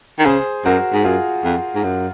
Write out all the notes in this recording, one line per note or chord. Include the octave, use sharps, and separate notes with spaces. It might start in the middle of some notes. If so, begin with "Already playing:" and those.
D#3
C#3 G#4 C5
F#2 F#4 A#4
G#2
F#2 F4 G#4
F2
G#2
F#2